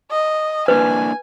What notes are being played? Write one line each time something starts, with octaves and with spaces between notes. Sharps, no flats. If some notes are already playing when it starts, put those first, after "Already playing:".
D#5
A#3 D4 E4 B4 G#5